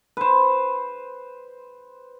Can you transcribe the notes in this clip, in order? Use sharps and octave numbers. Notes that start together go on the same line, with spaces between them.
B4 C5